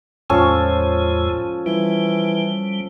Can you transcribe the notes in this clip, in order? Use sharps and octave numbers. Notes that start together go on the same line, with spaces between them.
E2 A2 F3 G#3 C#4 A4
E3 G3